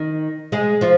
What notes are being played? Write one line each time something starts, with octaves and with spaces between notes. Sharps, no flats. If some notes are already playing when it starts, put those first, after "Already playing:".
Already playing: D#3 D#4
G#3 G#4
F3 F4